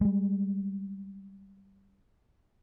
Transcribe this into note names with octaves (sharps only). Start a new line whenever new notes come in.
G3 G#3